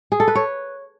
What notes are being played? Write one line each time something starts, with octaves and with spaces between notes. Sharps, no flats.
G#4
A4
B4
C#5